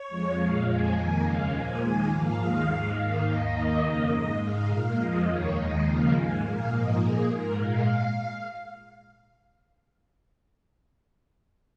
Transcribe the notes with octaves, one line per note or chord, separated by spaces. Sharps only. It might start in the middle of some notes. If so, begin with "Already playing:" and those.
Already playing: C#5
F2 F3 G#3
A#2 G#3 F5
F2 F3 G#3 G#5
F2 D#3 A#3 G#5
D#2 C#3 G#3 F5
A#2 F3 A#3 G#5
D#2 D#3 G#3 G#5
G#2 F3 A#3 F5
D#2 D#3 G#3
G#2 G#3
G#2 D#3 A#3 F5
D#2 D#3 A#3 D#5
D#2 D#3 A#3
F2 C#3 A#3
G#2 G#3 D#5
G#2 G#3 F5
A#2 A#3 F5
F2 F3 G#3 D#5
D#2 D#3 A#3 C#5
D#2 D#3 G#3 D#5
D#2 C#3 F3 A#3 F5
G#2 G#3 G#5
A#2 A#3 F5
G#2 F3 A#3 D#5
A#2 A#3 G#4
G#2 G#3 A#4
A#2 G#3 F5